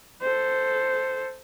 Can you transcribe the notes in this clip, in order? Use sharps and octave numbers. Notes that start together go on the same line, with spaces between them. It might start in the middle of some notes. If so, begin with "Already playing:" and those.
A4 C5